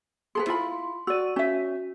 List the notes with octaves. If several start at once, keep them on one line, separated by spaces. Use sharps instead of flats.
G#4 A4 B4 C6
E4 F4 B5
F#4 D5 E6 D#7
C#4 F#4 E5